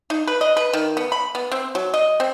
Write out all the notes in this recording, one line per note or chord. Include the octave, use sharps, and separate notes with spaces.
D#4
B4
D#5
B4
D#3
B3
B5
B3
C4
F#3
D#5
C4